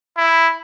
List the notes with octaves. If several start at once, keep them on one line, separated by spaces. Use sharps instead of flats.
E4